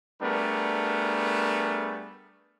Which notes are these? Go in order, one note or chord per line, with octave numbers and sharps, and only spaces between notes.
G3 A3 B3 D4 G#4 A#4